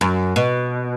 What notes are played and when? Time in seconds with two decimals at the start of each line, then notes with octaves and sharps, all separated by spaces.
0.01 F#2
0.36 B2